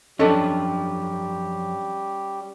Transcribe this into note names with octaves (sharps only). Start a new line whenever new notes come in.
F#2 F3 G3 C#4 D4 G4 A4 D#5